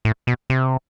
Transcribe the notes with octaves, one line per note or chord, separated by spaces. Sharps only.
A2
B2
C3